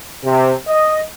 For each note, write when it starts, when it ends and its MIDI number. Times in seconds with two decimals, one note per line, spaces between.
0.24 0.52 48
0.68 0.99 75